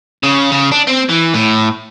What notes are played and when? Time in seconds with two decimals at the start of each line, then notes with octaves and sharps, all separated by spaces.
0.23 C#3
0.52 C#3
0.72 D4
0.87 C4
1.09 E3
1.34 A2